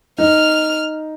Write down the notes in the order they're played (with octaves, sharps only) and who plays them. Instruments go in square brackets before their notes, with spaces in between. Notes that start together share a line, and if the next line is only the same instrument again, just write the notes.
[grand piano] D#4 [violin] F6